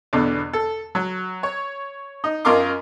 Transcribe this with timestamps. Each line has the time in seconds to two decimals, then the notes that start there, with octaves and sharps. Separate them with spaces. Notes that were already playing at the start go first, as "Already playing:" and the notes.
0.13 E2 B2 D3
0.53 A4
0.95 F#3
1.43 C#5
2.24 D#4
2.45 F#2 F4 A#4 D#5 C6 D6